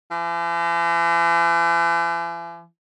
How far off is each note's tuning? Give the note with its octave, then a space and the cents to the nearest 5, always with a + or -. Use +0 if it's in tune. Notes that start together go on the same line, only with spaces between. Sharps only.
E3 +45